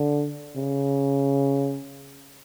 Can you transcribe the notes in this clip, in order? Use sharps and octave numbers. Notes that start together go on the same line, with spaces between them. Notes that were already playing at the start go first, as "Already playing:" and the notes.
Already playing: D3
C#3